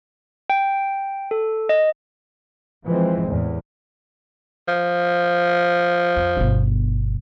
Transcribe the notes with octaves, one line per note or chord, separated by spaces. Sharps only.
G5
A4
D#5
E3 F3 G#3 C4
E2 A2
F3
F2
G1 B2